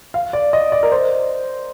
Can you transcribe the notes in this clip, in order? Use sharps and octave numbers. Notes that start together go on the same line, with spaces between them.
F5
D5
D#5
D5
A#4
C5